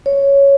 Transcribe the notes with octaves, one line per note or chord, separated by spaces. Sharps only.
C#5